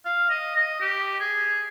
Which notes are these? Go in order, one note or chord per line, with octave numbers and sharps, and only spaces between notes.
F5
D#5
D#5
G4
G#4